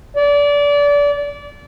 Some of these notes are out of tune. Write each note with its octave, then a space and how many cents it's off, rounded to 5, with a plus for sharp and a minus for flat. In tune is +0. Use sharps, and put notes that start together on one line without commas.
D5 -25